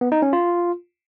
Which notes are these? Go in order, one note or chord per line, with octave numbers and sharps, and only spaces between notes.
B3
D#4
C#4
F4